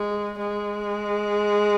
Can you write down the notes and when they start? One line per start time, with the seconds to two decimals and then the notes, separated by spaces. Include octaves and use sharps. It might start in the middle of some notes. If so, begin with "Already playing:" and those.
Already playing: G#3
0.38 G#3